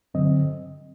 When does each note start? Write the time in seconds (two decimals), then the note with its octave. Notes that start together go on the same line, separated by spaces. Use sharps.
0.14 G2 D3 F#3 C4 D#5